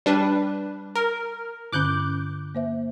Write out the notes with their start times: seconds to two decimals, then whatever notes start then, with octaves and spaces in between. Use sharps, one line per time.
0.06 G3 D4 B4
0.95 A#4
1.73 G2 D3 C#4 D6 F#6 G6
2.55 A#3 C5 E5